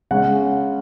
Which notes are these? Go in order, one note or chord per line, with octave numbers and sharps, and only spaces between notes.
C#3 G#3 C#4 F#5